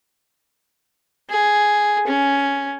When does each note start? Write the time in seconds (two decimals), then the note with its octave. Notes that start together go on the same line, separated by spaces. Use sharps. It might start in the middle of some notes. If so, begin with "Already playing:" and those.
1.30 G#4
2.07 C#4